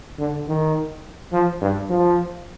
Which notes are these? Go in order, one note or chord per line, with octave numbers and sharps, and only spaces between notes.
D3
D#3
F3
G2
F3